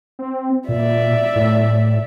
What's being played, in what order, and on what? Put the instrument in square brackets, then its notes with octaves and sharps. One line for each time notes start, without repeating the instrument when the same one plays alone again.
[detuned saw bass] C4
[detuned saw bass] A#2 [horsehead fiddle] D5 E5
[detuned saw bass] A2